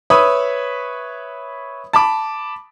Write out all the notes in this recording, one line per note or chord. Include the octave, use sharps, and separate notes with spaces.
B4 C#5 E5 B5 D#6
A5 B5 D6